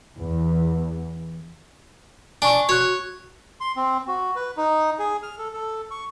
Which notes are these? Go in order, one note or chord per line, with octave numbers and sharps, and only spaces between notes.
E2 E3
D4 G#5 C#6
F#4 C#5 F#6
C6
C4
F#4
B4
D#4
G#4
F6
A4
A4
C#6